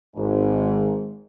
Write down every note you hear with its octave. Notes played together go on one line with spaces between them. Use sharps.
G#1 G#2